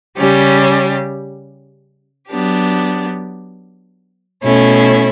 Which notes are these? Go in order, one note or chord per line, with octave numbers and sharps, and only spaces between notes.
C#3 G3 C#4 G4
F#3 B3 D4 G4
B2 A3 C#4 E4